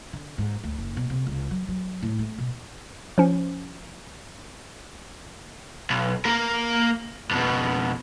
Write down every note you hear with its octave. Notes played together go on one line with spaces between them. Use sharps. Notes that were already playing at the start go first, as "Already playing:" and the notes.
D3
G#2
D2
F#1
B2
C3
C#2
F#3
F#3
A2
A3
B2
F3 C#4
B1
A#3 A#4
F2 B2